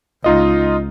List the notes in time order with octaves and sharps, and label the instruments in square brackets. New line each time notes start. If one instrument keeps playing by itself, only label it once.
[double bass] C#2 [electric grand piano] D#4 F4 D#5